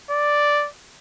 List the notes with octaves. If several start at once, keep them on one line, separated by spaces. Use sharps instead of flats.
D5